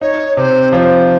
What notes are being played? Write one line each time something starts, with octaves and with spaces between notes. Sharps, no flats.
D#4 C#5
C3 C5
F3 C5 C#5